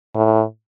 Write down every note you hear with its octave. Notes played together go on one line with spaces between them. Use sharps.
A2